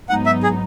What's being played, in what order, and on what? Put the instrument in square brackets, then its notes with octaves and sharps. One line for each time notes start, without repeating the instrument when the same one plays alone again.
[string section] G#2 F#3 B3 D#4 [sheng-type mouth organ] F#5
[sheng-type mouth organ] E5
G#4